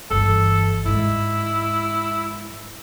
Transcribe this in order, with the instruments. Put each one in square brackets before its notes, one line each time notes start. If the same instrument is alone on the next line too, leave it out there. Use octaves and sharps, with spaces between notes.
[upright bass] G1 E3 [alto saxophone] A4
[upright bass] G#2 G#3 [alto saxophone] E4